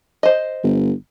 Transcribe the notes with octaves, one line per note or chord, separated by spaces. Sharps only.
C5 D#5
G1